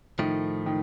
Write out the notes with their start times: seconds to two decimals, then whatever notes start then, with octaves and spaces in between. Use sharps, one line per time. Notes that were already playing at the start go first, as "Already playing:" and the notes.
0.19 A2 D#3 F3 A3
0.66 D#3